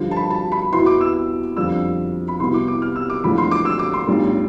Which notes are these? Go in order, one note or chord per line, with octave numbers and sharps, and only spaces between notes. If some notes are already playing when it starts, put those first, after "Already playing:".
Already playing: G2 D3 F3
A5
B5
A5
B5
E2 B2 B3 E4 C6
D6
E6
F2 D3 G3 D4 F4 E6
B5
C2 B2 B3 E4 C6
D6
D6
F6
E6
D6
E1 E2 D3 F3 A3 B5
C6
D6
E6
D6
C6
B1 A2 G3 D4 F4